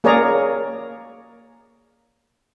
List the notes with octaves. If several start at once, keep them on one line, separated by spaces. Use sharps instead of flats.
A#3 G#4 A#4 C#5 D5 A#5